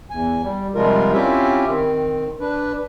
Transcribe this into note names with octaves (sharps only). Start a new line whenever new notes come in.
E2 G#5
G3
C3 F3 G3 G#3 F4 A#4
C4 C#4 E4 F4 G4 E5
D#3 C4
D4 B4